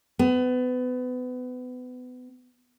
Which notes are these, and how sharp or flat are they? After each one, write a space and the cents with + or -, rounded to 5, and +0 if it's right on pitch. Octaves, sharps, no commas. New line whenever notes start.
B3 +30